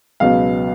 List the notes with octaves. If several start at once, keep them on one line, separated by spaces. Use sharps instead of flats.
C#2 B2 F#3 B3 F5